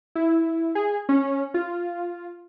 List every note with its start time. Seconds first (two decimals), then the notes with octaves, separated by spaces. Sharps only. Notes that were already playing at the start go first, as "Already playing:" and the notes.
0.15 E4
0.75 G#4
1.09 C#4
1.54 F4